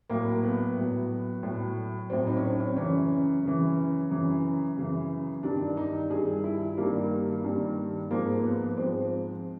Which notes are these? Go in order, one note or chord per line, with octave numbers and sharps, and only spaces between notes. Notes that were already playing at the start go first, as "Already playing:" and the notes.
A2 F#3 A#3
B3
A2 F#3
A2 F#3
A2 F#3 C4
D#4
C#4
C4
C#4
F#2 C#3 E3 C#4
F#2 C#3 E3
F#2 C#3 E3
F#2 C#3 E3
G2 D#3 G3 D4
D#4
G2 D#3 G3 G#4
E4
G2 D#3 G3 A#3
G2 D#3 G3
G#2 F3 G#3 A#3
B3
G#2 F3 G#3 C4